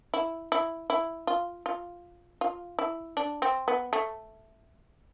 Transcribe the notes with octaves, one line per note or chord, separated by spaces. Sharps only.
E4
E4
E4
F4
F4
F4
E4
D4
C4
B3
A3